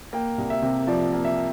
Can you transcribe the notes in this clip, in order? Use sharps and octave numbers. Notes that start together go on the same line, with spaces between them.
A#3 G5
C2
E5
C3
F3 D5
A#3
E5